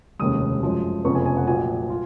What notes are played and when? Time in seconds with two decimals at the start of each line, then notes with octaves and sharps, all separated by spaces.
0.19 F1 D#2 C#3 G#3 D#6
0.62 F#2 F3 G#3
1.04 F1 F2 C#3 F3 B3 C#6
1.15 G#5
1.26 G#5
1.37 F#5
1.47 A#1 A#2 F#3 G#5
1.90 F4